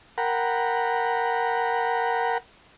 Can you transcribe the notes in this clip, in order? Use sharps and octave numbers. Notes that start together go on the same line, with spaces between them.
A#4 F#5 G5 A#5 B5